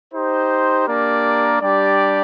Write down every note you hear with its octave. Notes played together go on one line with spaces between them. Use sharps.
D#4 G4 C5
A#3 D4 G4 A#4 D5
G3 D4 G4 D5